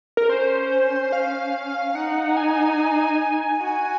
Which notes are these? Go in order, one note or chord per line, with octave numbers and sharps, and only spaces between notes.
A#4
C#4 C5
C#4 F5
D#4 F#5
G#5
F#4